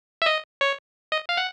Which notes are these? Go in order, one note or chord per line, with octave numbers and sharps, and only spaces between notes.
E5
D#5
C#5
D#5
F5
F#5